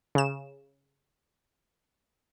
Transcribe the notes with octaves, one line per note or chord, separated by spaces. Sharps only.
C#3 E7